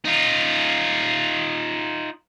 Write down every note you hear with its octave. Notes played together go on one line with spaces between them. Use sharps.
D#4 F4